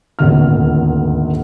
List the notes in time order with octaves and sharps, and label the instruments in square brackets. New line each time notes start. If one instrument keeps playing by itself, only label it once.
[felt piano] D#1 G#1 D2 F6